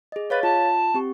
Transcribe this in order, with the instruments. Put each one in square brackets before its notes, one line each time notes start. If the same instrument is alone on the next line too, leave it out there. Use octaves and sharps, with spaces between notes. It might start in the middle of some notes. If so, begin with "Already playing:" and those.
[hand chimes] G#4 D#5
[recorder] B4 [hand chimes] C#5 F5 A6
[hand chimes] F4 [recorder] A5
[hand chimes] C4 G4 C#6